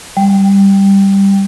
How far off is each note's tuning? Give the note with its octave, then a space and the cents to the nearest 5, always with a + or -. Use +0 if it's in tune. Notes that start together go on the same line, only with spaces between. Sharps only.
G3 +5